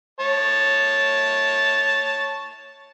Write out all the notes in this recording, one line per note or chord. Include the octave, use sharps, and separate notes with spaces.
C#5 A5